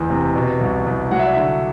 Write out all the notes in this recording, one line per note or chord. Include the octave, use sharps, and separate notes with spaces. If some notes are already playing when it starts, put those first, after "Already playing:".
Already playing: F#1 E2
C3
B2
C2
C2
F#3 F#5
E5
D5
D3 E5